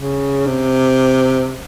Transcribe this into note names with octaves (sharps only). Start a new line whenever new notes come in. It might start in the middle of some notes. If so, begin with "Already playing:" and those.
Already playing: C#3
C3